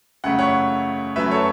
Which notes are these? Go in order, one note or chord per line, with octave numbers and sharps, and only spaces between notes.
F#2 C#3 A3 F#5
C#5 F#5
F#2 F#3 A3 B4 E5
A4 C#5